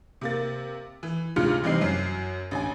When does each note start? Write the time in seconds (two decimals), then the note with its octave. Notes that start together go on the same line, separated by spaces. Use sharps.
0.21 C3 A#3 A6
1.03 E3
1.36 D2 G#2 C3 F4 F6 C#7
1.64 C3 E3 G3 C4 D#4 C7
1.81 F#2 F#3 C7
2.51 A1 D2 G#5